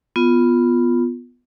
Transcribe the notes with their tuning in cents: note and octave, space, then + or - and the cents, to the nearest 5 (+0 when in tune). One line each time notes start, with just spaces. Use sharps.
B3 +0 F4 +0